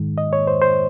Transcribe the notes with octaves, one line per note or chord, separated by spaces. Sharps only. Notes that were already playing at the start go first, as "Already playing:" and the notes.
Already playing: G#2 D#3 G#3
D#5
C#5
C5
C5